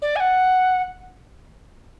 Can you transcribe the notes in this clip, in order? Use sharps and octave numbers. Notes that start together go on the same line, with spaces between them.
D5
G#5
F#5